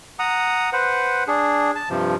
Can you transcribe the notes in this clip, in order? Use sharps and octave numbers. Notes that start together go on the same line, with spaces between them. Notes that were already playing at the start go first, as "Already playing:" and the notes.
F#5 A#5 D#6
B4 C5 F#5
D4 G#4
A5
G2 C3 F3